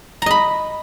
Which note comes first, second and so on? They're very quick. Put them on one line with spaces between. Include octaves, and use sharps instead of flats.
A#5 D#5 B5